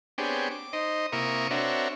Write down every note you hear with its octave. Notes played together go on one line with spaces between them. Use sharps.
B3 C4 D4 G4 G#4 C#5
D6
D#4 C5 D#5
C3 A#3 E4 A#4 C#6 D#6
C4 D4 F#4 A#4 C#5 E5